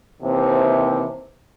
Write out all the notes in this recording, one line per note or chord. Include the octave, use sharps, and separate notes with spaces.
D#2 C3 E3 C5